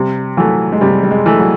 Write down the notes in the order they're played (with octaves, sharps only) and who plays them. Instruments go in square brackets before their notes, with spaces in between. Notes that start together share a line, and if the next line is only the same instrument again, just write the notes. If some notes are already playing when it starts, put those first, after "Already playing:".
Already playing: [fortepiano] C3 [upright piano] G3
[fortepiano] E3 A3 [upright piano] F#3
[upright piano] G#3
[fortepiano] C3 [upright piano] G3
[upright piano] G3
G#3
[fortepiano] E3 A3
[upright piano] F#3